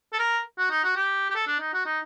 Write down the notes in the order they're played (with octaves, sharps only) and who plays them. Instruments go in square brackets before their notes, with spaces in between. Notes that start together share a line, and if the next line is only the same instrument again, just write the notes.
[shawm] A4
A#4
F#4
D#4
F#4
G4
G4
A4
D4
D#4
F#4
D#4